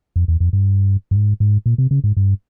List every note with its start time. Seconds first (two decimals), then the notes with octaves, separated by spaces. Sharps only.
0.16 F2
0.28 E2
0.40 F2
0.53 G2
1.11 G2
1.16 G#2
1.40 G#2
1.66 A#2
1.78 C3
1.91 C#3
2.04 G#2
2.17 G2